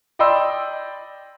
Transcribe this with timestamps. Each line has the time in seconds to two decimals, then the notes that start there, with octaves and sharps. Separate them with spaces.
0.19 D5 D#5 G5 B5 C6 E6